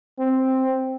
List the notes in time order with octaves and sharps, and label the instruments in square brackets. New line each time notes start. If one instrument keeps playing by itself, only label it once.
[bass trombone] C4